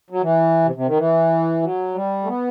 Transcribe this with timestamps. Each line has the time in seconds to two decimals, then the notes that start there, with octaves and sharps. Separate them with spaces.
0.10 F#3
0.21 E3
0.65 C3
0.75 C3
0.87 D#3
0.97 E3
1.63 F#3
1.94 G3
2.23 A3
2.28 B3